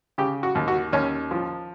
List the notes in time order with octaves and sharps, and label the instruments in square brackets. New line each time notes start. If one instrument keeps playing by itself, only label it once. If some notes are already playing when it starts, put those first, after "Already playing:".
[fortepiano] C#3 G4
F#4
D#2
F#4
D#2 C#4
F3